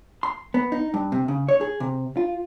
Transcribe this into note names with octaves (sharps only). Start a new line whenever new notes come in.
C6
B3
D#4
G2
C3
C#3
C#5
G#4
C3
F4